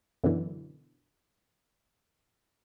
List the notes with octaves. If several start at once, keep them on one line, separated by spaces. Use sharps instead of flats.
F#2 B2 D3 E3